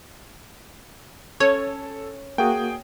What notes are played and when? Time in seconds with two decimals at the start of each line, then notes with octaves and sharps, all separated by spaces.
1.40 C#4 A4 C#5
2.38 A#3 F#4 G#4 G5 D#6